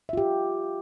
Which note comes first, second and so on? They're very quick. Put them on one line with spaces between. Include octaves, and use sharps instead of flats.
E5 F4 G4